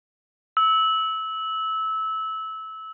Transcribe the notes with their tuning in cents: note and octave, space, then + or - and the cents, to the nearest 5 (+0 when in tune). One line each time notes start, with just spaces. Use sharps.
E6 -20